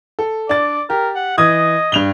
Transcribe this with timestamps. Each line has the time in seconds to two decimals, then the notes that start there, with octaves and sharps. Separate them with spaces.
0.19 A4
0.49 D4 D5 A6
0.90 G4 A#4
1.15 F#5
1.38 E3 D#5 D#6 G#6
1.92 G2 F7 G7